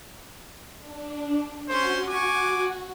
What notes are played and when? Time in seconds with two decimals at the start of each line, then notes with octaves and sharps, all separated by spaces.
0.78 D4
1.69 C#4 F#4 C5 C6
2.09 G#5 C#6 D6